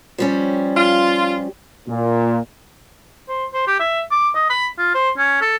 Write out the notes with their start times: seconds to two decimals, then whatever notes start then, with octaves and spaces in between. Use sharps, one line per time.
0.18 F3 G3 C#4
0.77 F4
1.87 A#2
3.28 C5
3.54 C5
3.67 G4
3.80 E5
4.11 D6
4.35 D#5
4.50 B5
4.78 F4
4.94 C5
5.17 C#4
5.41 A4